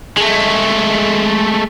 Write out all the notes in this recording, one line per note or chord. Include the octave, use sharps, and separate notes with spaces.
G#3 A3